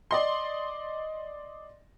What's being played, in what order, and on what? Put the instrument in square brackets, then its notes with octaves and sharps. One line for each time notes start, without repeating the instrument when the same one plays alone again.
[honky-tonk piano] D5 D#5 C6